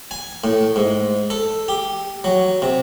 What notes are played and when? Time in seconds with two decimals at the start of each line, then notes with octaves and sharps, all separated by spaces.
0.11 G#5
0.44 A2
0.76 G#2
1.30 A4
1.68 G4
2.24 F#3
2.62 C3